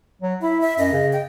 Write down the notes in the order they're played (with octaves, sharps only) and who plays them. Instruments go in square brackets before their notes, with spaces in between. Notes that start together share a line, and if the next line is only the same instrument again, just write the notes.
[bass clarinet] F#3
[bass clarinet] E4 [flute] E5
[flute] E5
[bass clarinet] F#2 [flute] D#5
[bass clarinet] C#3
[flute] G5